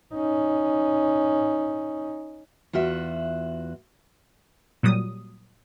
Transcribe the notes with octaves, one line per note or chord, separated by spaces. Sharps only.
C#4 D#4
E2 F4 F#4 E5
A#2 F#3 G3 D#6